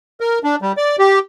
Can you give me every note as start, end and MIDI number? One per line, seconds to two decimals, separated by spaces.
0.21 0.39 70
0.44 0.56 62
0.62 0.72 55
0.77 0.96 74
0.99 1.19 67